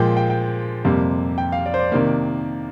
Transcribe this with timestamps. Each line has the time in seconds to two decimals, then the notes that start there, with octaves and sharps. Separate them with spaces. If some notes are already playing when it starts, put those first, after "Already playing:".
Already playing: A#2 F3 G#3 G5
0.17 G5
0.30 G5
0.85 F2 C3 G3 A#3
1.38 G5
1.52 F5
1.66 D5
1.74 C5
1.79 D5
1.92 C3 D#3 A#3